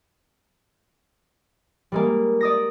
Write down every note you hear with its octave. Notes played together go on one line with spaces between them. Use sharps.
G3 G#3 A#3
D5 D#6 A#6